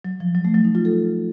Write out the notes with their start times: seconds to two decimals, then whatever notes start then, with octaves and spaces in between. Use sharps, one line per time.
0.05 F#3
0.20 F3
0.35 F#3
0.45 A3
0.54 F#3
0.64 D#4
0.75 F4
0.85 A4